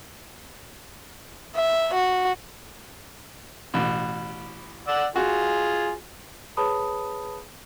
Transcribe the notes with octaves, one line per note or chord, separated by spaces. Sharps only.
E5
F#4
A1 B2
D5 F#5 E6
F4 F#4 G#4
G#4 B4 C#5 A5 B5 D#6